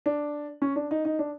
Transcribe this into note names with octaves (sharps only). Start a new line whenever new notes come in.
D4
C#4
D4
D#4
D#4
D4